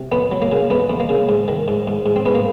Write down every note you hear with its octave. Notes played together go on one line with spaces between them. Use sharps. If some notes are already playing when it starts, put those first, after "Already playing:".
Already playing: C3
F2 B3
F#3
A#3
C#3
F2 B3
F2
A#3
C#3
G#2
D#3
G#2
G#2
G#2
C4
G#2 B3
A#3